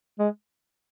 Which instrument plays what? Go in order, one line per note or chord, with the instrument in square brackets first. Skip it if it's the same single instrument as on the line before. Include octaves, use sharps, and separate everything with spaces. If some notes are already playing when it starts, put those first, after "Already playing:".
[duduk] G#3